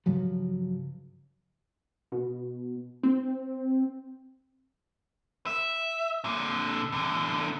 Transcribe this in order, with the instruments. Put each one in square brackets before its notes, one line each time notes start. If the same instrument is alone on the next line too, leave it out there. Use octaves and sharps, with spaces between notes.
[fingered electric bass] G2 C#3 F3 F#3
[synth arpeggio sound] B2
C4
[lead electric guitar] E5
A#2 D3
E2 D3